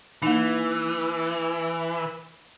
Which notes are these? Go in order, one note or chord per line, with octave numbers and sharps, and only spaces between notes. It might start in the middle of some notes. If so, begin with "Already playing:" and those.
E3 A#3 D#4